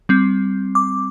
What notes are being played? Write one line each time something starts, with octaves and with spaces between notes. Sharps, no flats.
G3 C4
D6